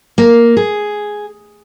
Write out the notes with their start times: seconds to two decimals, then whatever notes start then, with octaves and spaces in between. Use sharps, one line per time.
0.18 A#3
0.57 G#4